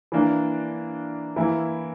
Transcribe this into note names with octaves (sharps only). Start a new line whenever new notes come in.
E3 A#3 D4
E3 A#3 E4